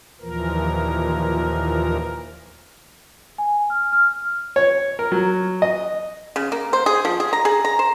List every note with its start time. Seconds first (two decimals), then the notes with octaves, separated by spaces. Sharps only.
0.20 D#2 A#2 E3 F3 A#4
3.38 G#5
3.70 F6
3.93 F6
4.56 C#5
4.99 A#4
5.12 F#3
5.62 D#5
6.36 C#3
6.52 A#3
6.73 C5
6.86 G#4
7.05 F3
7.20 G#4
7.33 A#5
7.45 G#4
7.65 A#5
7.79 C5